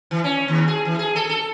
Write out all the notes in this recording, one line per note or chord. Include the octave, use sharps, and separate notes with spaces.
E3
C#4
D#2
G#4
E3
G#4
A4
A4